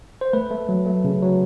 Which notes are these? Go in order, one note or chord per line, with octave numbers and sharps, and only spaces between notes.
C5
A3 B4
A3
F#3
A3
C#3
F#3